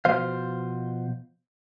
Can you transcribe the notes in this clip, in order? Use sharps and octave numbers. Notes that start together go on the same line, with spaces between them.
B2 F3 C5 F5